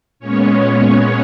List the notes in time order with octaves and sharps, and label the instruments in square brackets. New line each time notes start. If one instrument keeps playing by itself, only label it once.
[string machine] A#2 G#3 B3 C#4 C#5